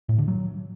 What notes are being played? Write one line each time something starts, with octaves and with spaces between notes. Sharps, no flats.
A2
D3
F#3